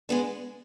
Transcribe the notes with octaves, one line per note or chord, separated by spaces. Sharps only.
G#3 B3 D4